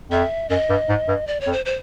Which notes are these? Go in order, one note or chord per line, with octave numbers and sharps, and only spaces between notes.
F2 E5
F#2 D#5
G2
G#2
G2
D5
C#5
F2
C5
C5